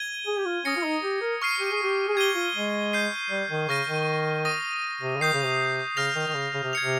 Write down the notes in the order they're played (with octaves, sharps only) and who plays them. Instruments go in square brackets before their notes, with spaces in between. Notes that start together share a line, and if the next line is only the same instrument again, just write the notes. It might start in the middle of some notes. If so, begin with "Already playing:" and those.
Already playing: [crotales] G#6 D#7 G7
[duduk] G#4
G4
F4
[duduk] C#4 [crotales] D#6 A#6 C#7
[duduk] F4
D#4
G4
A#4
[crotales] C#6 F6 C7 D#7
[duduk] G4
G#4
G4
G#4
[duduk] G4 [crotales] G#6 D#7 G7
[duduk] F4
G#3
[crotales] G6 C7 D#7
[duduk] G3
D#3
[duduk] C#3 [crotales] C#6 F6 A#6 D#7
[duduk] D#3
[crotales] D#6 A#6 D#7
[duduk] C3
C#3
[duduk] D#3 [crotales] D#6 G6 C7
[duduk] C#3
C3
[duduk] C#3 [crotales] F6 A#6 F7
[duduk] D#3
D#3
C#3
C#3
C3
[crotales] G#6 C#7 F7
[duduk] C3